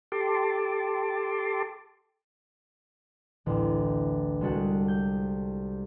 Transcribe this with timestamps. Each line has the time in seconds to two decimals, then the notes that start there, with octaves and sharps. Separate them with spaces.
0.12 G4 A4 A5 C6 D6
3.46 A1 D2
4.41 C2 G#3 F#4 A4 F#5
4.88 G6